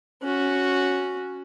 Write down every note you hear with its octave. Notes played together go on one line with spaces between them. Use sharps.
C#4 F#4